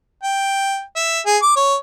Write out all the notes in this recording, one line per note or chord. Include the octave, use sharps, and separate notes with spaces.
G5
E5
G#4
D6
C#5